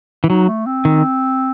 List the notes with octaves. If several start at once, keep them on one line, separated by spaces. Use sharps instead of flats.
E3
F#3 D#4
A3
C4
D#3